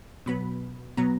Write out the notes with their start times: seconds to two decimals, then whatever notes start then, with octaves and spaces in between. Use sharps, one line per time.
0.26 B2 F#3 B3 B5
0.97 B2 F#3 B3 A#5